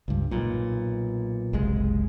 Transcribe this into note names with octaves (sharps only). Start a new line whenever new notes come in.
C#2 G2
B1 A#2
F#1 C2 F#2 G#3